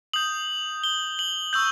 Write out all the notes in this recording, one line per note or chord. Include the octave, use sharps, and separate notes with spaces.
D#6 G6 F#7
G7
F#7
C#6 E6 G6 F#7